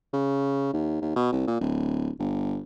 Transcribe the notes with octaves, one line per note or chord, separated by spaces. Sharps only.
C#3
D#2
D#2
B2
C2
A#2
D1
G1